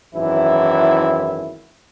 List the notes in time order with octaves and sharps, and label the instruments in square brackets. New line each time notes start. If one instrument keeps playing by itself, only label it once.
[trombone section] G#1 F#2 E3 E4